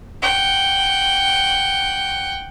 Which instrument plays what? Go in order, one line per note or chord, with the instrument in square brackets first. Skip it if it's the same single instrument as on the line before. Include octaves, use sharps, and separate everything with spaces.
[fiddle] F#5 G5